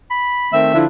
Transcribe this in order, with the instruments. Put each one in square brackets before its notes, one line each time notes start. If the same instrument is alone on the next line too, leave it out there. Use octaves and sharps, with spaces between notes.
[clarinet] B5
[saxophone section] D#3 A3 C4 [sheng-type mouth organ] E5
[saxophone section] D3 F3 E4 [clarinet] D4